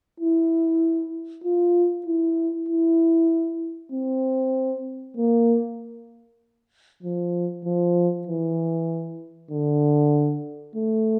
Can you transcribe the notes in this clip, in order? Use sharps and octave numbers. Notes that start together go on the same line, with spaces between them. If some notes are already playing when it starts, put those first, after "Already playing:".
E4
F4
E4
E4
C4
A#3
F3
F3
E3
D3
A3